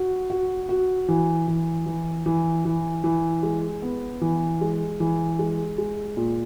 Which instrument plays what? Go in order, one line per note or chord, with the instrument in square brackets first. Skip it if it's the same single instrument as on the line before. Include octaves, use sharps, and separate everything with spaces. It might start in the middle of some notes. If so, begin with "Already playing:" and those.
Already playing: [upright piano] F#4
F#4
F#4
E3
E3
E3
E3
E3
E3
G#3
B3
E3
G#3
E3
G#3
G#3
A#2